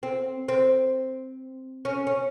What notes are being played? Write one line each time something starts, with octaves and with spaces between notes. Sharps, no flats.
C4
C4
C#4
C#4